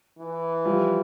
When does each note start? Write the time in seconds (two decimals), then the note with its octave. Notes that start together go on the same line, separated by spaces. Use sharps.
0.18 E3
0.65 F3 G3